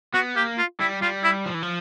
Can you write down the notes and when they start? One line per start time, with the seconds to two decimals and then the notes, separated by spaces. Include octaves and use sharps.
0.14 B3 F#4
0.36 A#3 G4
0.58 F4
0.80 G3 E4
1.02 G3 F4
1.24 E4
1.46 F3
1.54 E3
1.63 F3